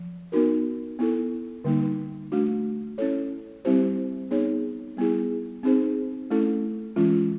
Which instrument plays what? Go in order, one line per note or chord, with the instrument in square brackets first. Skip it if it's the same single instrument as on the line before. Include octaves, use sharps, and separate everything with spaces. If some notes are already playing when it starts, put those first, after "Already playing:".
Already playing: [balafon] F3
B3 D#4 F#4 A#4
B3 E4 A4
D3 G3 A#3 D#4
A3 D4 F#4
C#4 E4 A4 C#5
G3 C4 E4 G4 C5
B3 D#4 G#4 C#5
G3 B3 E4 G#4
C4 D#4 G#4 C5
A3 C#4 E4 A4
E3 G#3 C#4 F4